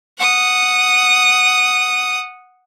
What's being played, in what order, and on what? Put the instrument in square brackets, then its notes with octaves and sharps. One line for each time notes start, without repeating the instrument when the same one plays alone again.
[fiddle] F#5 D#6